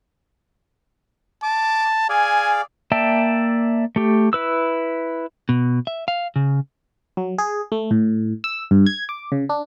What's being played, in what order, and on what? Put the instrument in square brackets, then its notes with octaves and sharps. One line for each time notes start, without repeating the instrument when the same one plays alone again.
[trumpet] A5 [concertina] D6
[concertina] G#4 D5 F5 [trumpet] G#5
[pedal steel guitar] A#3 D5 E5 G5 A5
A3 G4
E4 B4 E6
[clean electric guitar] B2
E5
F5
C#3
[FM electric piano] F#3
G#4
A3
A2
E6
G2
G#6
D6
C#3
D4